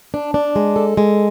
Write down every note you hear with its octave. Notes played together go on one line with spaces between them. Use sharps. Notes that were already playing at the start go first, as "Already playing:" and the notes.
D4
D4
G#3
A4
G#3